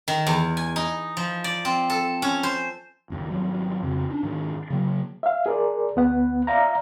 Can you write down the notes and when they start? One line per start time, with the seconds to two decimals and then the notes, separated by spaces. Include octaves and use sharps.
0.08 D#3
0.27 E2
0.57 G#5
0.76 D#4
1.17 F3
1.44 D5
1.65 C4
1.90 A4
2.22 C#4
2.43 C5
3.10 F#1 D#2
3.28 G#1 F#3 G3
3.82 F2 C#3
4.10 C#4 D4
4.23 G#2 D#3 D4
4.70 C#3 F#3 A#3
5.23 E5 F5
5.46 G#4 A#4 D5
5.96 D2 B3 F#5
6.47 D5 E5 F5 A#5